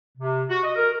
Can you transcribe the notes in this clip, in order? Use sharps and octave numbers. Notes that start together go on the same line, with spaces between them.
C3
F#4
D#5
A#4